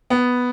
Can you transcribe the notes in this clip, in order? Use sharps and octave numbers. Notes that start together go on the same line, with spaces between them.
B3